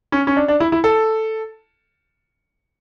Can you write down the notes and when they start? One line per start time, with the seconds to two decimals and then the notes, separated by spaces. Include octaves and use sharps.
0.12 C#4
0.27 C#4
0.37 D4
0.48 D4
0.60 E4
0.72 E4
0.84 A4